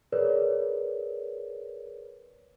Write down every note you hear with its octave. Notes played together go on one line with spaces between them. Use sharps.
G#4 A#4 B4 C#5 D5